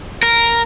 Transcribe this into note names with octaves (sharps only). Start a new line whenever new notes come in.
A#4